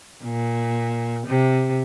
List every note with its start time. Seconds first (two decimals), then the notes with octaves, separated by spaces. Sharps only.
0.23 A#2
1.26 C3